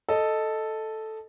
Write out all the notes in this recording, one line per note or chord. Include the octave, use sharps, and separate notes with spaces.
A4 D#5